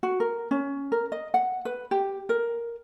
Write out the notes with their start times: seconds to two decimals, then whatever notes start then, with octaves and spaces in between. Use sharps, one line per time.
0.03 F#4
0.20 A#4
0.51 C#4
0.92 A#4
1.12 D#5
1.34 F#5
1.65 B4
1.91 G4
2.29 A#4